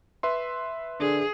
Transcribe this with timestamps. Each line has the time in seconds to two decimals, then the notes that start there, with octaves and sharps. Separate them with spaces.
0.23 B4 E5 C6
1.00 D3 G#4